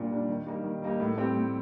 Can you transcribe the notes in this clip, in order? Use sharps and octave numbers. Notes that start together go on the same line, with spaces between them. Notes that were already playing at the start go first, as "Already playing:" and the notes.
Already playing: A#2 G3 D4
G3 D4
D#3
G3 A#3 D#4 G4
D#3
G3 A#3 D#4 G4
A2
G3 C4 G4
A2